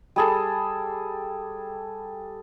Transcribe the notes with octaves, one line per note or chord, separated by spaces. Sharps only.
G3 G#4 A4